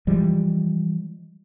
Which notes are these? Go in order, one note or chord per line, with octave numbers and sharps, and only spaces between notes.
E3 F3 G3 G#3